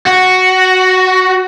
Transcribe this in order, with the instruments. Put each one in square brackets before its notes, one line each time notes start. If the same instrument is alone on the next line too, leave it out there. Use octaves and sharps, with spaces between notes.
[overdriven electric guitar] F#4